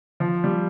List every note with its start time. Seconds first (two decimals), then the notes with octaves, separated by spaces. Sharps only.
0.20 F3
0.44 G3